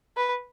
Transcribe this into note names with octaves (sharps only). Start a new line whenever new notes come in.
B4